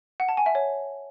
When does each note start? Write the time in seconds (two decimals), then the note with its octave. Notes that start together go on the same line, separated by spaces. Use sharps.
0.20 F#5
0.29 A5
0.37 G#5
0.46 E5
0.55 C#5